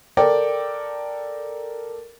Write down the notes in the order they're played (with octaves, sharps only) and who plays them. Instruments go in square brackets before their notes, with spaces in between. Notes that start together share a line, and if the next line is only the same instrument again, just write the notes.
[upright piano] A4 A#4 D5 G5